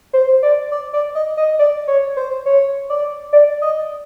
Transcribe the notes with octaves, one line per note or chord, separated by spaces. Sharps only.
C5
D5
D5
D5
D#5
D#5
D5
C#5
C5
C#5
D5
D5
D#5